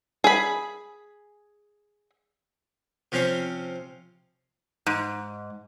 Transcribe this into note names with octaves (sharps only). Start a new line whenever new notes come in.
G#4 B5
C3 F3 C4 C#4
G#2